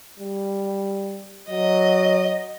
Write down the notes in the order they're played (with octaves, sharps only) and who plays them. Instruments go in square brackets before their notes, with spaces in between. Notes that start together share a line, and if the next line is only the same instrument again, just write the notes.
[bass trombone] G3
[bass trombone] F#3 [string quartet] D#5